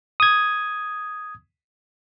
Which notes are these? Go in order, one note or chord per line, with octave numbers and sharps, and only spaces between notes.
D#6 G#6